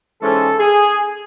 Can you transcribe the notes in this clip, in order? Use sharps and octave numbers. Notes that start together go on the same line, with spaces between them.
G#2 E3 G#3 C#4 A4
G#4